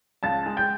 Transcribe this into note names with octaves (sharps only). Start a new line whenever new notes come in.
C#2 A5 A6
G#3
G5 G6